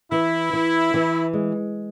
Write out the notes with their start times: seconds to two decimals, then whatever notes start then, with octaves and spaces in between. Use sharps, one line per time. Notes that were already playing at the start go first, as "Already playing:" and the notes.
0.12 E3 E4
0.53 E3
0.94 E3
1.33 G#3